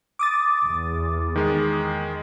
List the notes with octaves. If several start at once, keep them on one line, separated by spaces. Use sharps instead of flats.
D6 D#6 A6
E2
D#3 G#3